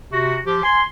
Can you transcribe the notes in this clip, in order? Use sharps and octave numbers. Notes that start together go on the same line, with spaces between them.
C3 F#4
F3 G4
G#5 C6